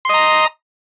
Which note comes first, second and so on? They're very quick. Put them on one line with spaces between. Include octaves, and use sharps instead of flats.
C6 D#5 A#5